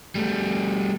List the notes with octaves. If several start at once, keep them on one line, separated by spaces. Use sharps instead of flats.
G3 A3